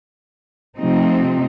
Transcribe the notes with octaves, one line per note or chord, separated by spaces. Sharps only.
C3 F3 A3 C4 D#4